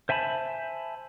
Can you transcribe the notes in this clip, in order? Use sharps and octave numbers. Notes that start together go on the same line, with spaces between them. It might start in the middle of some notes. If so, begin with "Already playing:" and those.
C5 E5 G#5 A5 B5